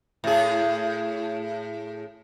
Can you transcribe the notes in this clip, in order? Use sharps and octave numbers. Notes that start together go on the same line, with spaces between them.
A2 G#4